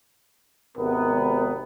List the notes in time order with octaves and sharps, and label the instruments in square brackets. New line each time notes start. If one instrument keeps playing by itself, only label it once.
[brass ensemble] G#1 C3 B3 [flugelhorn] A#4